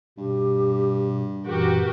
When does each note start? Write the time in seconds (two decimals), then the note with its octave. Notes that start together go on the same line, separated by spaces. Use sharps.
0.18 G2 B2 G4
1.46 F#2 A#2 E3 F#4 G4 A#4